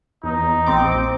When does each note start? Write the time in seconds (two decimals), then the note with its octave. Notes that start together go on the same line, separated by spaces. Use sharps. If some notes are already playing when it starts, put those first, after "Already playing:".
0.23 E2 D#4
0.66 A#1 C4 D6